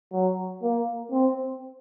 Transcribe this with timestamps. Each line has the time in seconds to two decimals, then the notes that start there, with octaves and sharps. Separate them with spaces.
0.12 F#3
0.62 A#3
1.12 C4